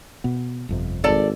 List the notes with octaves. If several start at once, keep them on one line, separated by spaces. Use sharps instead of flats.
B2 B3
G1 F2 C3
G#1 A4 D5 A5